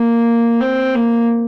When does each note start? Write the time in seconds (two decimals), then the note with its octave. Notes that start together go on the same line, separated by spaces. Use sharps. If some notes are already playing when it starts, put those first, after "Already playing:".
Already playing: A#3
0.61 C4
0.95 A#3